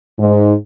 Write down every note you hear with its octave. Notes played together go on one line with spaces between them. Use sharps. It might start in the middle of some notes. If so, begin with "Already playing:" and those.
G#2